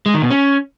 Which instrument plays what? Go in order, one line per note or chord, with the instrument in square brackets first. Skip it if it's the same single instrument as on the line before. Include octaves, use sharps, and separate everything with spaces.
[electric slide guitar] G#3
D#3
B2
C#4